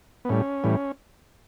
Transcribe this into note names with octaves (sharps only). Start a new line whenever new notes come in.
B3
A2 G3 C#4
A2 E3 G3